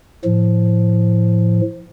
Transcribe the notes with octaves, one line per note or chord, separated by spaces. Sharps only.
A2 F3